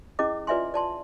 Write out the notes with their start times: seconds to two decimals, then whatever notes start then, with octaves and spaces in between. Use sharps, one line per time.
0.19 C#4 E4 G#4 D#5 D6
0.47 F4 B4 D5 E5 G#5 C6
0.74 D5 A5 C6